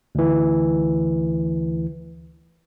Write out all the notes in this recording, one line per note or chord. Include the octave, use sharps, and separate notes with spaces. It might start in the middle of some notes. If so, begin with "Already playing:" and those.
D2 E3